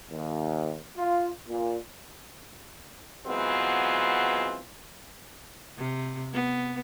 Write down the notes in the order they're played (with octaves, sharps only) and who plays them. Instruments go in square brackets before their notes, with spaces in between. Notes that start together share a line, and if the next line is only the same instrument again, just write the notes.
[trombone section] D#2
F4
A#2
[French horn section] E3 F#3 G#3 B3 C4 F4
[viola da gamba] C3
B3